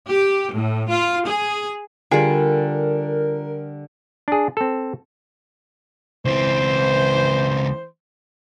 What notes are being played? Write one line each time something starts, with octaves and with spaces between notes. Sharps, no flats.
G4
A2
F4
G#4
D3 G3 F4 G#4 A#4 G5
D4 G#4
C4 A4
C#2 E3 C4 C5